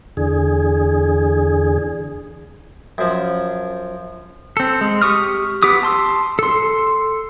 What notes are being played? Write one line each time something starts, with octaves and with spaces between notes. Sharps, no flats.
E2 D3 G#4
F#2 F3
C4 A4
G#3
G4 C#6 D#6 F6
B3 G4 D6 D#6
A5 C6 E6
A4 C6